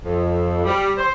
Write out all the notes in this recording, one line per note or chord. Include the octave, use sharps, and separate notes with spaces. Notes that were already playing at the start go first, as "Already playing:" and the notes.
F2
G3
C5